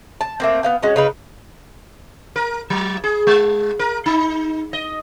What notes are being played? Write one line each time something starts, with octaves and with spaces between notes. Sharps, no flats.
A5
A3 A#3 C4
B3 F5 G5
G#3 C#4 F#4
C#3 D#4 B4
A#4
F#3
G#4
G#3
A#4
D#4
D#5